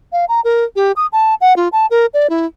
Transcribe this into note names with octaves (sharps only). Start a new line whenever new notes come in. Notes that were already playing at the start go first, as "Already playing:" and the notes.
F5
A#5
A#4
G4
D#6
A5
F#5
F4
A5
A#4
D5
E4